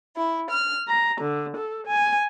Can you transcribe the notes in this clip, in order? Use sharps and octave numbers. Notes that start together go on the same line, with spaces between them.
E4
F6
A#5
D3
A4
G#5